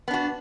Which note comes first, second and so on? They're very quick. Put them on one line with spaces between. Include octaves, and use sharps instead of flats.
B3 D4 F#4